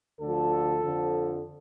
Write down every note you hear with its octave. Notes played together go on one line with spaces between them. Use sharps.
D2 D3 F3 A4
F2 D3 F3